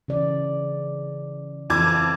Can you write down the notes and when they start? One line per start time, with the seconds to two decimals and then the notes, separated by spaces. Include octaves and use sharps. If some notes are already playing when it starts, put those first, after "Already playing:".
0.08 C#3 E3 D5
1.70 F2 E3 E4 A4 D6 G#6